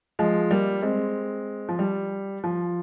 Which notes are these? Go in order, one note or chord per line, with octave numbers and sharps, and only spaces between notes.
F3 G#3
G3 A#3
G#3 C4
F3
G3
F3